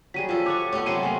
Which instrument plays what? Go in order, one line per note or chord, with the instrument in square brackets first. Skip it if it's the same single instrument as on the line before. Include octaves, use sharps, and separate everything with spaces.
[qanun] F#3 G3 G#4 [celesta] B6 D#7
[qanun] F3 G3 [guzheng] A4 D#5 A5
[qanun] C#5 F#5 C#6 [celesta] D6
[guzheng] A3 B3 [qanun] G4 D#5 [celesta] C#5
[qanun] C3 C6 [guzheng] F#3 G#3 D4 [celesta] D#7
[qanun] A3 A#3 [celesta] G#5